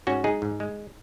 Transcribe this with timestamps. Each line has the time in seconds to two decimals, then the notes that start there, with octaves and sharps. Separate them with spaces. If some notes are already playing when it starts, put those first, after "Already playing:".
0.07 G#2 C#4 F#4
0.24 G#3 D#4 G#4
0.42 G#2
0.60 G#3